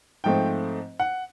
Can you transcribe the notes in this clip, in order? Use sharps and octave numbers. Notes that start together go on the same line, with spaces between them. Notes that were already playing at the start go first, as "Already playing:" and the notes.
G#2 F3 A3 C4 G5
F#5